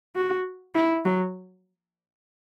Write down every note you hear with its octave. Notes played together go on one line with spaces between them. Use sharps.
F#4
E4
F#3